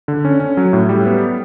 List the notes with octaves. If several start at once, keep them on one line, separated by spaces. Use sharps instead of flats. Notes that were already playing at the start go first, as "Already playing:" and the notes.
D3
C#4
C#4
F#3
A2
G3
B3